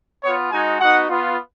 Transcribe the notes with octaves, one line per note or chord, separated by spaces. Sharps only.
B3 F4 C#5
G#3 D#4 F#4 G#5
B3 D#4 F#4 F#5
B3 F4